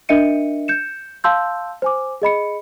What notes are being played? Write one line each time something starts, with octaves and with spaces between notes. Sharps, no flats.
D4 A#4 D#5 E5 C#7 D#7
G6 C#7 E7
F5 A5 C6 E6 G6
C5 G#5 D6
G#4 D#5 B5 C#7